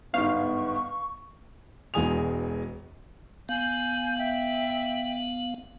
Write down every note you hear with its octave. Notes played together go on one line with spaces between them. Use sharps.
G1 G#2 B3 F5 C#6
E1 E2 G#3 G#5 D#6 F7
B3 F5 G#5 G6
E5 G5